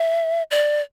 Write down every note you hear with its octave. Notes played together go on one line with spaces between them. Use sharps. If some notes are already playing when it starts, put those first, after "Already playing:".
Already playing: E5
D5